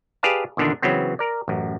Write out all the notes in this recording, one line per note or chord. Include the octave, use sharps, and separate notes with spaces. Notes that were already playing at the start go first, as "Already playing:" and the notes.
G4 G#4 B4 D5 F5 A5
E2 A#2 D3 D#3 D4
C#3 E3 F#3 B3 C4
A#4 D5
A1 F#2